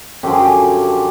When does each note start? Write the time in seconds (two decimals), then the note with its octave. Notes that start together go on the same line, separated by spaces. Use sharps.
0.23 F#2 D3 F3 G4
0.33 G#4
0.42 G4